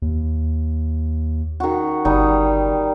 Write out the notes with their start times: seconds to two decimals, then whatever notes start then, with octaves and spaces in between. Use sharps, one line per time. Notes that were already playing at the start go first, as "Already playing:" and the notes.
0.02 D#2
1.60 D#3 F#4
2.05 G1 G3 D#4